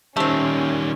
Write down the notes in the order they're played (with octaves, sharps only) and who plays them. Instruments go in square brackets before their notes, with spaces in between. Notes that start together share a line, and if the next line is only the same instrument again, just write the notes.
[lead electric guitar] D#3 G3 [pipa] A3 C4 [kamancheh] C#4